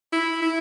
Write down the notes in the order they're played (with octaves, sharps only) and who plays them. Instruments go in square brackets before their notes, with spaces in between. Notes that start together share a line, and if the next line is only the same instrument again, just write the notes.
[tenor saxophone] E4
E4